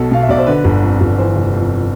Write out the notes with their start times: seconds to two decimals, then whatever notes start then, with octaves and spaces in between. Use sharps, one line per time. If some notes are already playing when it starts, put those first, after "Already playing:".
Already playing: B1 B2 A4
0.11 B2 F5
0.22 E5
0.29 B1 D5
0.39 C5
0.47 D3 B4
0.64 G1
0.82 F2
1.00 G1
1.18 E3 C5
1.36 F1
1.53 F2